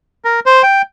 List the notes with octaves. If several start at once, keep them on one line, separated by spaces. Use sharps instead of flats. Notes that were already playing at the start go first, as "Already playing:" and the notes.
A#4
C5
G5